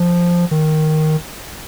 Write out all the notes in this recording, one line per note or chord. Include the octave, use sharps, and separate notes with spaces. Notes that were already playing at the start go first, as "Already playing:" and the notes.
Already playing: F3
D#3